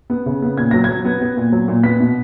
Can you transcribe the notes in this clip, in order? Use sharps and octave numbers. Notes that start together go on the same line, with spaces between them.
B3
C#3
B3
A#2 G#6
F#3 A#6
F#3 G#6
B3
B3
A#2
F#3
A#2
B3 B6
B2